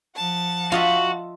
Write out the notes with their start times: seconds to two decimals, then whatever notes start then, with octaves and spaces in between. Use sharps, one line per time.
0.15 F3 F#5 A5
0.72 F4 F#4 D#5 E5